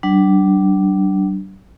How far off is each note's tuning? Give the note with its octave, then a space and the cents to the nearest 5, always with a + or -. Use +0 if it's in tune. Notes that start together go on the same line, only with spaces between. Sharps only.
G3 -45 D4 +0